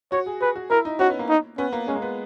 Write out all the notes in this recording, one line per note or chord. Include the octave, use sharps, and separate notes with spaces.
F#4 C#5
G#4
G#4 B4
F#4
E4 A#4
D#4
C#4 F#4
B3
A#3
D#4
B3 C#4
A#3
G#3 C#4
A#3
B3